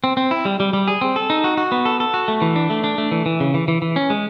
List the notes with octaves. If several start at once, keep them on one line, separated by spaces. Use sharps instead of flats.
C4
C4
E4
G3
G3
G3
G#4
C4
A4
D#4
F#4
F#4
B3
A4
A4
F#4
A3
E3
D4
A3
D4
A3
E3
E3
C#3
E3
E3
E3
C#4
G#3